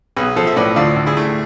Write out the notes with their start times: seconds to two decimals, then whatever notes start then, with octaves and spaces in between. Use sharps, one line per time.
0.16 B1 G#4 B4
0.36 F3 A4 C5
0.47 E5
0.56 A2 B4 D5
0.76 D2 D4 F4
0.96 D2
1.06 E4 G#4
1.17 A3